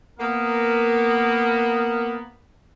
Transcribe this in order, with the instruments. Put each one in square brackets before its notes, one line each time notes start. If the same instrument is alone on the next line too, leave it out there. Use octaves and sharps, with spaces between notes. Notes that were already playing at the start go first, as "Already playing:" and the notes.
[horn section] A#3 B3 A#4